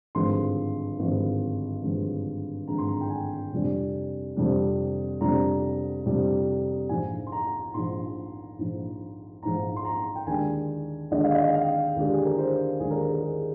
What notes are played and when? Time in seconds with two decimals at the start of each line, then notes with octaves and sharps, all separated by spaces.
0.15 G#1 G2 D3 F3 G#3 C6
0.99 G#1 G2 D3 F3 G#3
1.83 G#1 G2 D3 F3 G#3
2.68 G#1 G2 D3 F3 G#3 A#5
2.78 C6
2.89 A#5
3.01 G5
3.10 G#5
3.52 F2 C3 G3 D4
4.36 F2 C3 G3 D4
5.21 F2 C3 G3 D4 A#5
6.05 F2 C3 G3 D4
6.89 A#1 G#2 F3 G#5
7.27 C6
7.32 A#5
7.74 A#1 G#2 F3 C6
8.58 A#1 G#2 F3
9.42 A#1 G#2 F3 A#5
9.76 C6
9.85 A#5
10.15 G5
10.27 D#2 D3 G#3 D4 G#5
11.11 D#2 D3 G#3 D4 D#5
11.24 F5
11.35 D#5
11.47 G5
11.54 F5
11.96 D#2 D3 G#3 D4 G4
12.13 G#4
12.26 A#4
12.38 C5
12.80 D#2 D3 G#3 D4 G#4
12.91 A#4
13.01 G#4
13.12 A#4
13.22 G#4